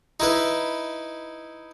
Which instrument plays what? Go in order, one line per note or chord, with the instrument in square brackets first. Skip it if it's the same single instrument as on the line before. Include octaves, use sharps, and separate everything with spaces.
[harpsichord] D#4 E4 B4